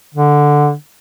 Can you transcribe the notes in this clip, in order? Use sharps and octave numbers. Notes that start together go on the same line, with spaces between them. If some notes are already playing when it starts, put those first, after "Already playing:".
D3